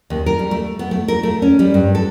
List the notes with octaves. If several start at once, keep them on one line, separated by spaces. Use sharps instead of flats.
D#2
A#4
G3
A3
B3
A3
A#4
A3
C#4
G3
G2
A4